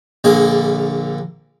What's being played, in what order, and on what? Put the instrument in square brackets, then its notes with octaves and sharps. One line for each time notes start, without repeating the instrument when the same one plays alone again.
[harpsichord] A#1 D3 A#3 G#4